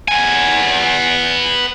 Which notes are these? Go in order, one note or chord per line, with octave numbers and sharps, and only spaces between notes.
B3 G#5